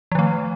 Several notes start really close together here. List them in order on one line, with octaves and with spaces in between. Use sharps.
F3 D#3 A3